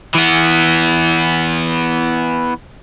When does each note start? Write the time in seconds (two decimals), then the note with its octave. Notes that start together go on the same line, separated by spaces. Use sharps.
0.14 E3 B3